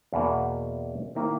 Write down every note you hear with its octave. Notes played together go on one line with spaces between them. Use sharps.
E2 B2 A#3
D#3 A#3 E4